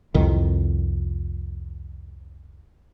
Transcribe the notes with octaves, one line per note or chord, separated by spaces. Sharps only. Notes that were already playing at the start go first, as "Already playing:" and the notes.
C2 F2 D#3